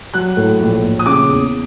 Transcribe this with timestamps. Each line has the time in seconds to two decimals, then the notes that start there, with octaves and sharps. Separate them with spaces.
0.14 F#3 F#6
0.37 A2
0.60 A#1
0.83 A#1
0.99 D#6
1.06 C#3 D6
1.29 E2